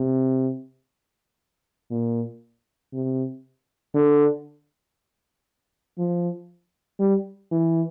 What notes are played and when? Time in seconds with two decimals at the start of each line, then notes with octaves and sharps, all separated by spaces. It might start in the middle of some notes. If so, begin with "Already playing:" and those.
Already playing: C3
1.91 A#2
2.93 C3
3.95 D3
5.99 F3
7.00 G3
7.52 E3